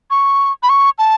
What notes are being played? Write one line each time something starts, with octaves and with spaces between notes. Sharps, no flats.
C#6
B5
C#6
A5